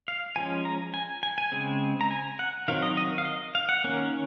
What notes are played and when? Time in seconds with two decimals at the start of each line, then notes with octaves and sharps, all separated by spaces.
0.08 F5
0.36 F3 G#3 C#4 G#5
0.65 A#5
0.94 G#5
1.23 G#5
1.38 G#5
1.52 C#3 G#3 C4
2.01 A#5
2.11 G#5
2.39 F#5
2.68 D#3 F#3 C4 F5
2.82 D#5
2.97 D#5
3.18 F5
3.25 D#5
3.55 F5
3.69 F#5
3.84 D#3 A#3 C#4